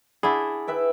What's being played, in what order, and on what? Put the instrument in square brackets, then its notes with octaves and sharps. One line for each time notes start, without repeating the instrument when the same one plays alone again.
[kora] D4 E4 [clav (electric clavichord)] G#4 [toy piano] F#5 B5
[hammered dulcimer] B4 E5 G5